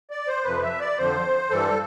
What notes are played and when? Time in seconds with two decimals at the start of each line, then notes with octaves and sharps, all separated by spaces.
0.10 D5
0.28 C5
0.44 F2 C3 F3 B4
0.62 E5
0.80 D5
0.98 F2 D3 F3 C5
1.50 G2 E3 G3 A4